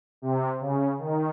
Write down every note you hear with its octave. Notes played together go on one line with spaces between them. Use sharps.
C3
C#3
D#3